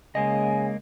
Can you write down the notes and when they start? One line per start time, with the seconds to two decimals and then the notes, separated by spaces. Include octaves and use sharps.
0.15 C#3 G#3 A#3 D#5 G#5